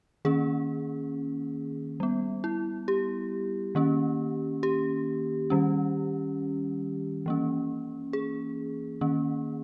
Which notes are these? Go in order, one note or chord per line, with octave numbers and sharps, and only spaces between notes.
D#3 A#3 C#4 G#4
G3 B3
E4
G4
D#3 A#3 C#4
G4
D#3 G3 C#4
E3 A#3 C#4
G#4
D#3 A#3 C#4